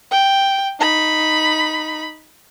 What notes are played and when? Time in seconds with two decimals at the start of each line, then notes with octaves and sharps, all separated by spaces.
0.11 G5
0.80 D#4 B5